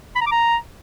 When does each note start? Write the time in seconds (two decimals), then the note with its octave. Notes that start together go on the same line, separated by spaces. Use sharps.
0.16 B5
0.21 A#5
0.26 D6
0.32 A#5